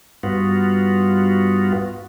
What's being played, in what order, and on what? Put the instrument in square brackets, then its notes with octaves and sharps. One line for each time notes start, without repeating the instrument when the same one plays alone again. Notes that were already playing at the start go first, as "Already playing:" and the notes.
[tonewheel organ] G2 B3 F4 F#4